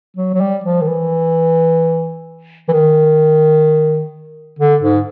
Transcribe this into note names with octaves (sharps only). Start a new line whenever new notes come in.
F#3
F#3
G3
F3
D#3
E3
E3
D#3
D3
G#2